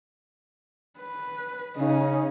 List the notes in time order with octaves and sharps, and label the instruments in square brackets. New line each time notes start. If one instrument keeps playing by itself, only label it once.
[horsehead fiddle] B4
[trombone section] C#3 [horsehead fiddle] C#4 D#4